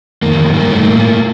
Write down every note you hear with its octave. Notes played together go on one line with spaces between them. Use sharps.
F2 D#3 A#3
G2 D#3 A#3
A3
A2 A#3